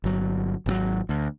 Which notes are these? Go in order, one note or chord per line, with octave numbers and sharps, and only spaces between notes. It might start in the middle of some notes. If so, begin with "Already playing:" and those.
G1 F#3
G#1 C#3 F#3
D2